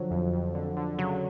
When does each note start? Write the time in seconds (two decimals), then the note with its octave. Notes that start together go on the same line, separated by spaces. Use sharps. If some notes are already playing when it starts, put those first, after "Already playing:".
Already playing: D3 F3 F#3
0.11 F2
0.33 F2
0.55 D3
0.77 D3
0.99 C#3 F#3